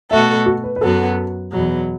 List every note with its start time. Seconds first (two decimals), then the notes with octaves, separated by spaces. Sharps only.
0.11 B2 A3 F#4 A4 E5
0.46 F#4
0.64 B4
0.76 B4
0.81 F#2 F#3 B3 F#4 A4
1.51 E2 B2 F#3